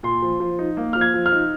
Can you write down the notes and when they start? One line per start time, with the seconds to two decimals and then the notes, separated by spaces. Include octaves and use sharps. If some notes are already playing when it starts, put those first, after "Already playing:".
0.03 A#2 C6
0.22 F3
0.40 F3
0.59 D#4
0.77 A#3
0.93 F3 F6
1.01 G#6
1.14 F3
1.26 F6
1.32 D#4